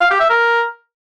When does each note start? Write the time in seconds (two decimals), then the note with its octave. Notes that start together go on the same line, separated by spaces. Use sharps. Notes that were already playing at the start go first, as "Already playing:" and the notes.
0.01 F5
0.10 G4
0.20 E5
0.30 A#4